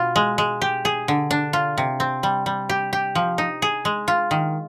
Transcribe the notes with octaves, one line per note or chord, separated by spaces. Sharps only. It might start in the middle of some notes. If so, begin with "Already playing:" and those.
Already playing: B2 F4
G#3
G#3
G4
G#4
D3
D4
F4
C3
C4
G3
G3
G4
G4
F3
D#4
G#4
G#3
F4
D#3